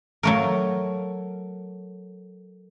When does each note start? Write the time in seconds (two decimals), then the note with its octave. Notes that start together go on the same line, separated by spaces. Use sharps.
0.23 F#3 A3 A#4